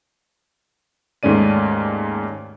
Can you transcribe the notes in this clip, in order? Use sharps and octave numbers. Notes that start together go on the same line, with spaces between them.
D#2 G#2 A3 C#4 D5 D#7